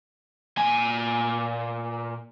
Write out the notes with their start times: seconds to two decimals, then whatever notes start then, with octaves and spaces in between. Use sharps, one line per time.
0.57 A#2 G#5